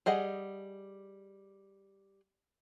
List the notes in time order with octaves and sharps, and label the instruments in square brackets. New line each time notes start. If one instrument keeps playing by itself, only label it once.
[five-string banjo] G3 G#4 D#5 F#5